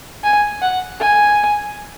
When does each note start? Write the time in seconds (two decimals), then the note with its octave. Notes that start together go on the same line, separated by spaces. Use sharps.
0.24 G#5
0.62 F#5
1.00 G#5